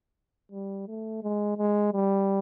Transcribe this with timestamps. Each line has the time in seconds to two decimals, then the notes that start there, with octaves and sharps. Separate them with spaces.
0.52 G3
0.88 A3
1.23 G#3
1.58 G#3
1.93 G3